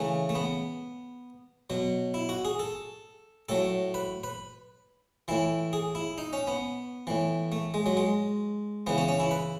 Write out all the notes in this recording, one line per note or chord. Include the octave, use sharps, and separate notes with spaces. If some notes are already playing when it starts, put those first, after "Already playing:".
Already playing: C#3 E3 A3
A3
B3
B2 F#3
E4
F#4
G#4
A4
A2 F#3 A4
B4
B4
A2 E3 E4
G#4
E4
D#4
C#4
B3
A2 E3
A3
G#3
F#3
G#3
C#3 E3 B3
C#4
C#4
E4
B4